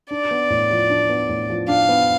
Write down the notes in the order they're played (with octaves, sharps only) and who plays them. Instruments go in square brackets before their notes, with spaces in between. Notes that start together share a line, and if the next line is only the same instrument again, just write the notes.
[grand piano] D4 [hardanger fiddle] D5
[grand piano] B3
A2
F3
D4
B3
A2
F3
[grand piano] D4 [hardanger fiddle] F5
[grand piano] B3